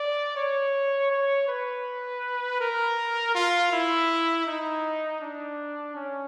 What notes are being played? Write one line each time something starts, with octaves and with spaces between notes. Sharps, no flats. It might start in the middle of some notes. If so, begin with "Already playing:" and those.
Already playing: D5
C#5
C#5
B4
A#4
F4
E4
D#4
D4
C#4